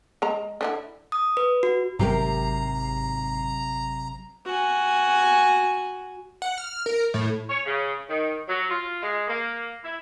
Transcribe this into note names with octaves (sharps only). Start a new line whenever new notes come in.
G#3 A#5
D3 D4 E4
D#6
B4
F#4
G#1 G#2 C3 F#3 G4 A#4 A#5 C7
F#4 G#5
F#5
F6
A#4
A2
C#5
C#3
D#3
F#3
F4
G#3
A#3
E4